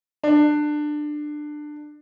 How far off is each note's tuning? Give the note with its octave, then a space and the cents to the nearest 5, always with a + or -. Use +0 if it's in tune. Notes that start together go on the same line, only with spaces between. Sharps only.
D4 +20